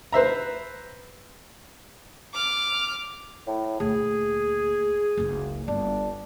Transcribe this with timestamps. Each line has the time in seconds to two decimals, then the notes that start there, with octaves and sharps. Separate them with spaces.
0.13 B4 C5 E5 A#5
2.34 D6 F6
3.47 A2
3.80 D2 A#2 G#4
5.17 F#1 C#2
5.68 G1 D4